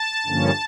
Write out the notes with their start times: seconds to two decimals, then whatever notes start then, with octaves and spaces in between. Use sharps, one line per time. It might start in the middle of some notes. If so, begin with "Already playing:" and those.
Already playing: A5
0.26 G2 D3 F3 A#3 C#4